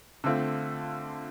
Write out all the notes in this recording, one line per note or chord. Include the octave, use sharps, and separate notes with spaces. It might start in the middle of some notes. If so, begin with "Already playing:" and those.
D3 A3 C4 F4